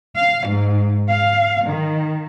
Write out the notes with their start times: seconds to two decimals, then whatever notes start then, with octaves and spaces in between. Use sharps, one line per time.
0.17 F5
0.49 G#2
1.10 F5
1.67 D#3